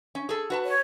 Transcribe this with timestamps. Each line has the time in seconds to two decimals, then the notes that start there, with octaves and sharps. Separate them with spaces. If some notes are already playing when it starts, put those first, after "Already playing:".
0.15 C#4
0.29 G#4 A4
0.50 F#4 B4 A5
0.65 C#5